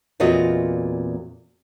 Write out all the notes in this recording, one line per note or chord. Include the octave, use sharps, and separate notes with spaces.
E2 A#2 C4 F4 F#4 D#5